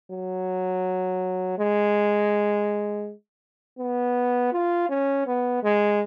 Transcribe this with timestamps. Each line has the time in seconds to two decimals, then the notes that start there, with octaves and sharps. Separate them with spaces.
0.12 F#3
1.58 G#3
3.79 B3
4.53 F4
4.89 C#4
5.26 B3
5.63 G#3